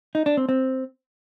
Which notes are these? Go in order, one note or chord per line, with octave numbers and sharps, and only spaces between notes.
D#4
D4
C4
C4